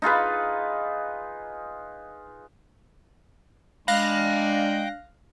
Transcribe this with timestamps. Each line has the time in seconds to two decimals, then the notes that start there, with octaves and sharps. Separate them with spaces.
0.02 D#4 F4 G#4 B4
3.88 G#3 D4 F5 G5 B5 F#6 A#6